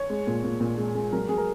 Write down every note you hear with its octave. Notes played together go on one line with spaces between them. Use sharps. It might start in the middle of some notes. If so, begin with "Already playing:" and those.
Already playing: C#5
G#3
A#2
A#2
A#2
G#3
G#3
F#3 A#4
F#3 G#4
A#4